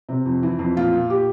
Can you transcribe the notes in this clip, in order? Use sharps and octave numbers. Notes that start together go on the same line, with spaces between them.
C3
F2
E3
F2
A#2 F4
A#2
G4